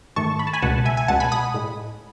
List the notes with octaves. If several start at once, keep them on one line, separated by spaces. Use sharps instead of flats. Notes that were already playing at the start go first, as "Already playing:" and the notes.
G#2 D#3 A3 A5 C#6
B5
A5
G#5 B5
C#2 B2 G#3 F#5 A5
E5 G#5
G#5
C#2 B2 G#3 F#5 A5
G#5 B5
B5 D#6
A2 G#3